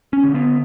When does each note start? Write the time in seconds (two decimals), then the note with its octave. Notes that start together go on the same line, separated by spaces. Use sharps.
0.13 C#4
0.24 D3
0.35 B3